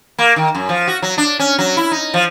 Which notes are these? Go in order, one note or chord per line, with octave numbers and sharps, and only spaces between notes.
A#3
D#3
F#2
F3
F#4
F#3
D4
C#4
F#3
E4
D#4
F3